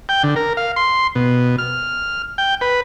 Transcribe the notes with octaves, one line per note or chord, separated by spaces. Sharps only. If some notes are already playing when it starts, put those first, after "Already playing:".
G5
D3
A#4
F5
C6
B2
F6
G5
B4